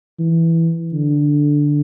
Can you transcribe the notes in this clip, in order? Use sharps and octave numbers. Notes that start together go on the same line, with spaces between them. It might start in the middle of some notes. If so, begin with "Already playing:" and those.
E3
D3